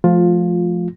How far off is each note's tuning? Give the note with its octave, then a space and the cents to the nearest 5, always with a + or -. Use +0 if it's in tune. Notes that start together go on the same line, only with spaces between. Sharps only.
F3 +0 A3 -20 F4 +15